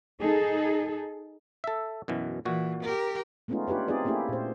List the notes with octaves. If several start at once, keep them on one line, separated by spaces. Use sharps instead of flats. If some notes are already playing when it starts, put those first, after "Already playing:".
D#4 G#4 A4
A4 E5
F#2 B2 E3
A#2 E3 F#4
G4 A#4
G#3 A3 B3 C#4 D#4 F4
D4 F4 G4 B4 C#5
C4 D#4 F4 G#4 D5
A3 A#3 C#4 E4 G4
A#2 C5